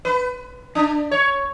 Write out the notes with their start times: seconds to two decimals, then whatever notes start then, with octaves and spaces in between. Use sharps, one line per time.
0.05 B4
0.75 D4
1.11 C#5